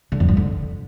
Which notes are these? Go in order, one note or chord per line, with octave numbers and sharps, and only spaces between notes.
D3
F2
G2
D3